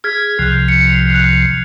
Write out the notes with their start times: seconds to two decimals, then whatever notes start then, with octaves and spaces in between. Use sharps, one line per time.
0.04 G#4 F6 G#6 B6
0.39 C2 C3 F3 F#6 G6
0.68 C#7
1.11 F#6 F7